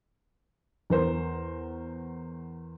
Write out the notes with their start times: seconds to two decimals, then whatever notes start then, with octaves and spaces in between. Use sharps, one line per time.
0.90 E2 A#4 C5